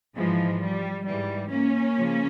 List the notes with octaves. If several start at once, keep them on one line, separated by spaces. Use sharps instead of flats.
G#2 E3 F3 G#3
G3
G#2 E3 G3
A#3 C#4
C#3 F3